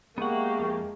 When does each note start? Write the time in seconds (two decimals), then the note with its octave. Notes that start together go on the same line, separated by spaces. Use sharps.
0.18 G#3 A#3 B3 G4 D#5 E5 F#5 C#6
0.59 F2